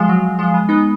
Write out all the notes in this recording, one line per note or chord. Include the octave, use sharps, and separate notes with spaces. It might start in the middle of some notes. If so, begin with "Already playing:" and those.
Already playing: F3 G#3
F#3
F3 G#3
G#3 B3
B3 D#4